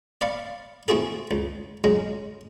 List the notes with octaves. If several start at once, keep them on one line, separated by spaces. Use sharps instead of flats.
D5 F5 B5 C#6
A3 C4 E4 F#4 G#4 A4
C#2
C#3 F#3 G#3